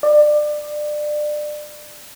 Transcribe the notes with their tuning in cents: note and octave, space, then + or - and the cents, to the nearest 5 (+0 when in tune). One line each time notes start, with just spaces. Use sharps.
D5 +25